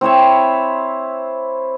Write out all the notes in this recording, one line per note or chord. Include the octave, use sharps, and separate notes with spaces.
C4 E4 C#5 E5